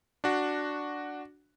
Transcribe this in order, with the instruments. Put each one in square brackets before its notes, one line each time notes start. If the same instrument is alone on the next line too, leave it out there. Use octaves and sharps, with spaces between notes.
[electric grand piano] D4 F#4